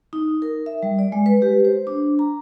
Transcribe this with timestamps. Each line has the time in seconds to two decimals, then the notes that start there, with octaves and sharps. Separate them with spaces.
0.13 D#4
0.42 A#4
0.66 E5
0.83 G3
0.99 D5
1.12 G#3
1.26 B4
1.42 G4
1.65 C5
1.87 D4
2.19 A#5